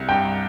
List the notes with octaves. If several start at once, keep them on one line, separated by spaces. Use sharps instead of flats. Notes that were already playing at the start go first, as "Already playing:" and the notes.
Already playing: C2
G2 G5